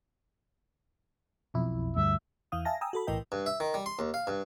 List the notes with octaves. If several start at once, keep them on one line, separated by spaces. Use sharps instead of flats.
B1 F2 E4
D2 G2 E5
E2 E3 F5 D#6
E5 F5 G#5 A5 A#6
G5 G#5 A#5 D#6 E6
F#4 A4 B5
B1 A2 E3 A#4 D#5 G5
G2
E5
D#3
G3
C6
D#2
F5
G2